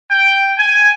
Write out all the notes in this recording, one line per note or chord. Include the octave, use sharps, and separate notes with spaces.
G5
G#5